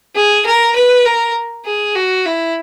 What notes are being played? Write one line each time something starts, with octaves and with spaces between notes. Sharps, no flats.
G#4
A#4
B4
A#4
G#4
F#4
E4